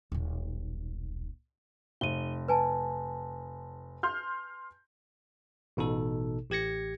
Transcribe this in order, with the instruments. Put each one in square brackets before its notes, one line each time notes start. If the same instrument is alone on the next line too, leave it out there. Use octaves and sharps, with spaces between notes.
[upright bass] D#1 B1
[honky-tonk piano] F1 [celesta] D#7 G7
[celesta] B4 G#5 A5
[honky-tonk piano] C6 F6 G6
[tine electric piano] A1 B2 D#4 A4
A1 G4 G#6 A#6 C#7